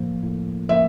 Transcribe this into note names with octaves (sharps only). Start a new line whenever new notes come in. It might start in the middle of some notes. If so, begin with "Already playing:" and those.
Already playing: A2 F3 A#3
A2
F3 A#3 E5